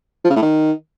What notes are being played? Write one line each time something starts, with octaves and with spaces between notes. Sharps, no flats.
F3
C#3
A2
D#3